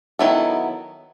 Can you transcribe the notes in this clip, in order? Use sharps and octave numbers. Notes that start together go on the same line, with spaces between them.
D#3 F#3 B3 E4 A4